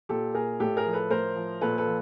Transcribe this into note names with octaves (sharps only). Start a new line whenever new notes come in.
A#2 G4 A4
A#2 G#4 A#4
A2 G4 A4
G#4 A#4
F3
A4 B4
A2 A#4 C5
F3
A#2 A4 B4
A4 B4
F3